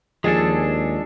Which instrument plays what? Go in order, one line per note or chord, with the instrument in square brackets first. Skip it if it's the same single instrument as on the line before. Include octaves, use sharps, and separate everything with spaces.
[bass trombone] D#2 [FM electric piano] F3 G#5 E6 [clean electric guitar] G#3 D4 A4 [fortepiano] G#4